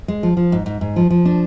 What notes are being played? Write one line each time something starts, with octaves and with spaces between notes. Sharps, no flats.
G#3
F3
F3
G#2
G#2
G#2
F3
F3
D4